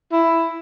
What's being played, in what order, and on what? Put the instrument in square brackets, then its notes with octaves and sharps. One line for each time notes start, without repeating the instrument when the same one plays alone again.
[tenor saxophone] E4